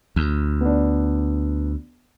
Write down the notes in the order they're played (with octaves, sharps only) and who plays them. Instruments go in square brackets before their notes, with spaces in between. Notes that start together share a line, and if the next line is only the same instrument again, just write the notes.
[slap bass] D2
[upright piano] B3 D4